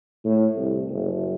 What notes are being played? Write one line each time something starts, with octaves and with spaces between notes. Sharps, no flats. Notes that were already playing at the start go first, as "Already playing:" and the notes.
A2
C2
F#1